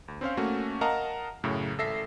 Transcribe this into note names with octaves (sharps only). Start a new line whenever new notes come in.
D2
C4 C#4 C5 F5
A3 A#3 C#4 F#4
A#4 D#5 F5 F#5 A5 A#5
F#2 A2 C#3
G#1 A4 E5 A#6 C7